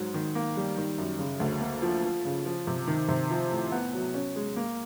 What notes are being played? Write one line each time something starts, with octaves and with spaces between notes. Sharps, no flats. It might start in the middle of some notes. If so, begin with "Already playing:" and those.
Already playing: G#2 F#3
D#3
A#3
G3
D#3
F#2
C#3
D2
A#3
F3
F3
C#3
F3
C3
D#3
C3
F3
A2
B3
F#3
C#4
G#3
A#3